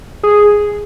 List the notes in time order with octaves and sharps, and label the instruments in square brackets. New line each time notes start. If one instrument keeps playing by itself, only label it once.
[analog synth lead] G#4